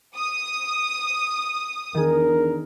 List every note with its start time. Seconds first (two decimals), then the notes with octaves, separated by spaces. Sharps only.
0.17 D#6
1.94 E2 D#3 D4 G#4 A#4